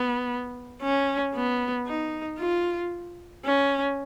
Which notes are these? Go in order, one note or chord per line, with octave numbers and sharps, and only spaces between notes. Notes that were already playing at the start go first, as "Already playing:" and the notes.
Already playing: B3
C#4
B3
D#4
F4
C#4